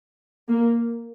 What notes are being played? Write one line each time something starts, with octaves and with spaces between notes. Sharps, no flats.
A#3